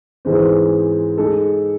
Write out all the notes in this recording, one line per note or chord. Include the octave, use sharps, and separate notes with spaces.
G#2 E3 G#3 C4
G#3 D#4 A4